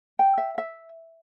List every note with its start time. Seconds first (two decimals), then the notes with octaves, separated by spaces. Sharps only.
0.19 G5
0.38 E5
0.58 E5